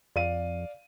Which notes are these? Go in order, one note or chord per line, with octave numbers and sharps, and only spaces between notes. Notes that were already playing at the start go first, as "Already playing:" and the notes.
F2 D5 F5 D#7